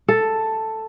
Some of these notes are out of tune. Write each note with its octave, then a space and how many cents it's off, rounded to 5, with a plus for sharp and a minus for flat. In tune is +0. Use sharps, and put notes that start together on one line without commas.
A4 +5